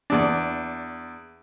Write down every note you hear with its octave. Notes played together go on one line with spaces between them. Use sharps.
E2 D4